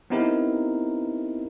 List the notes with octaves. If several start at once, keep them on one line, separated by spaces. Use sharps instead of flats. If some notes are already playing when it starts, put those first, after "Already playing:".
B3 C4 D#4 E4 G4 A#4